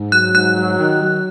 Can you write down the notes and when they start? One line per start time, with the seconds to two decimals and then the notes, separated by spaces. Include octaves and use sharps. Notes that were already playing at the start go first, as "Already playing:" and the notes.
Already playing: G#2
0.12 F#3 F#6
0.34 G#2 F#6
0.57 F#3
0.79 D#3
1.02 F#3